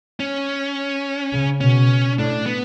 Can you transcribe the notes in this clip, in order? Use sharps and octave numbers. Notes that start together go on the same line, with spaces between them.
C#4
C#3
B2 C#4
A2 D4
B3